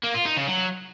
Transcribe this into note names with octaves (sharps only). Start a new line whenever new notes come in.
A#3
F4
D#4
C#3
F#3